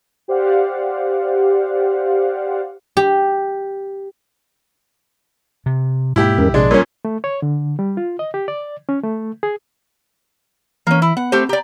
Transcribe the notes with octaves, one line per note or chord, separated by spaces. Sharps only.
G4 C5 D5 F5 F#5
G4
C3
G#2 B2 A#3 E4 G4
E2 G#2 G#3 C#4 A#4
A#1 C3 G#3 D4
A#2 G3 C#4 A#4 C#5
A3
C#5
D3
G3
F4
D#5
G4
D5
C#4
A3
G#4
E3 A#3 C#4
E4
B3 F#5
A3 C4 G4 C5
G4 D5 A#5